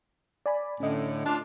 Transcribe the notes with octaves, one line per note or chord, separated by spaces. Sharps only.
D5 G#5 B5
A2 D3 C#4 D#5
D4 F4